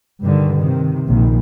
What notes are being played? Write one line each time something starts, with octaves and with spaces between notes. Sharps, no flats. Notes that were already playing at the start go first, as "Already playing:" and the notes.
G2 D3 D#3
C3 D#3
A#1 D#3